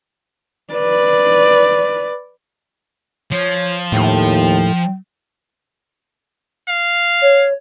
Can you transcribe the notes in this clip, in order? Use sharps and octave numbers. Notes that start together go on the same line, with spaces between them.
B4 D5
F3 C#5
D#2 A2 G5
F5
C#5